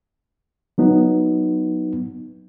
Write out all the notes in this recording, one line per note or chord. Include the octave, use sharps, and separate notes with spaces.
F#3 B3 D#4